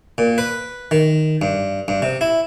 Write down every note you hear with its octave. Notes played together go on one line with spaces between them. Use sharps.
A#2
B4
D#3
G2
G2
C3
E4